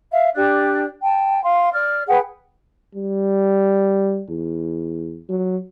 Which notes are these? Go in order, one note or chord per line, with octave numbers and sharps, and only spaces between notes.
E5 F5
D4 G4 D5 F#6
G5 A5
F5 C6
D5 F6
G#4 B4 F#5 G5
G3
E2
F#3